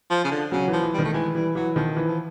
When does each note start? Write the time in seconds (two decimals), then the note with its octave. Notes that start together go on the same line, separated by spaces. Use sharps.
0.10 F3
0.24 C#3
0.31 D3
0.52 C#3 F#3
0.67 E3
0.73 F3
0.83 E3
0.94 D#3 G3
1.04 A3
1.14 E3 G#3
1.35 E3 G3
1.55 E3 F#3
1.76 D#3 F3
1.92 E3 F3
2.08 F3